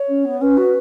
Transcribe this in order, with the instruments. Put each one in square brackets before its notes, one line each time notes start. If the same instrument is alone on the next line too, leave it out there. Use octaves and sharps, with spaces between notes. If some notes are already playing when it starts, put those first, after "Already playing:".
Already playing: [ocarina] C#5
[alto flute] C#4
B3
[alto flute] C#4 [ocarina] B4
[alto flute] F#4